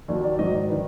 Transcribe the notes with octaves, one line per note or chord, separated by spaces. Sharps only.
D#2 D#3 F#3 D5
D5
G#2 D#3 F#3 D#5
D5
D#3 B4